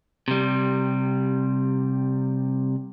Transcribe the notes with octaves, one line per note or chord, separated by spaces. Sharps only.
C3 G3